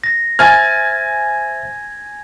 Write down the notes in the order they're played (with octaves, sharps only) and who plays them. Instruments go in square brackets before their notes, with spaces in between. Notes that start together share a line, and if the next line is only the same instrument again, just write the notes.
[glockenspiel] A#6
[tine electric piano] C5 E5 A6 [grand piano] G#5 F6 [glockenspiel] G#6